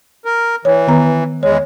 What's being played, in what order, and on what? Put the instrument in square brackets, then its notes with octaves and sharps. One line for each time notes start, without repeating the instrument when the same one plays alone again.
[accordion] A#4
[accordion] E3 [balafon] C#5
[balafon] D#3 B3 A#5
[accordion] E2 G#3 [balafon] C#5